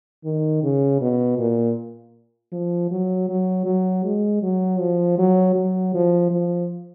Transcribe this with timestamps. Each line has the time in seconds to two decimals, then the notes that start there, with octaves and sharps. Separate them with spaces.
0.25 D#3
0.63 C#3
1.01 B2
1.39 A#2
2.52 F3
2.91 F#3
3.29 F#3
3.66 F#3
4.05 G#3
4.42 F#3
4.80 F3
5.18 F#3
5.55 F#3
5.94 F3
6.31 F3